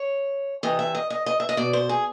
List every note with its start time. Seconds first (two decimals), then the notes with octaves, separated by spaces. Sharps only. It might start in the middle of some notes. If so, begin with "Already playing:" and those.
Already playing: C#5
0.63 C3 E3 D#5
0.79 E5
0.95 D#5
1.10 D#5
1.26 D#5
1.40 E5
1.49 D#5
1.57 B2 D5
1.73 C5
1.89 G#4